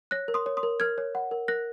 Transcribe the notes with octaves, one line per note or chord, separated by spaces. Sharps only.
C#5 F#6 A#6
A#4
C6 D#6
C#5
C6 D#6
A#4
A#4 F6 G#6
C#5
F#5
A#4
A#4 F#6 A#6